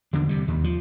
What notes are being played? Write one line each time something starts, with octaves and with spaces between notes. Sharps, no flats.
E2 D3 D4
C3 G3
D#2
F3